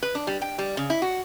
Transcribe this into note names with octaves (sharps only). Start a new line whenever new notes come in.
B4
D4
G3
G5
G3
C#3
E4
F#4